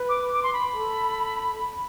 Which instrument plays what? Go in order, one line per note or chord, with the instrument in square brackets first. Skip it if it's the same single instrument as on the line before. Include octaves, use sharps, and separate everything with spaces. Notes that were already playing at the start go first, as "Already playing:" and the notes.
Already playing: [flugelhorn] B4
[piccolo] D6
D6
C6
B5
[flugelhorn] A4